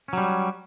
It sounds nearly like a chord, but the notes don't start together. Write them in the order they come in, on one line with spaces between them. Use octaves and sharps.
C#4 F#3 G3